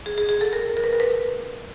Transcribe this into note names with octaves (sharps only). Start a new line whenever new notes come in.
G#4
G#4
G#4
A4
A#4
A#4
B4
A#4
B4